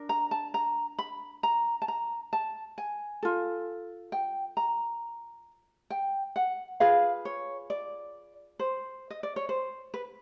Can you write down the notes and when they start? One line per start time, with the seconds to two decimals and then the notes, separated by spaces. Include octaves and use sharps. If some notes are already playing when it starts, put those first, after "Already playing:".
Already playing: D4 A#4
0.09 A#5
0.31 A5
0.54 A#5
0.99 B5
1.43 A#5
1.82 A5
1.88 A#5
2.33 A5
2.78 G#5
3.23 F4 A4
4.12 G5
4.57 A#5
5.90 G5
6.36 F#5
6.80 F4 G#4 B4 F5
7.25 C#5
7.70 D5
8.59 C5
9.10 D#5
9.23 D5
9.36 C#5
9.49 C5
9.94 B4